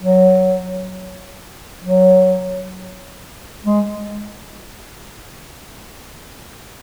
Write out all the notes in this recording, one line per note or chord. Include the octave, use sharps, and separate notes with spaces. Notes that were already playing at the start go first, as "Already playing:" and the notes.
F#3
F#3
G#3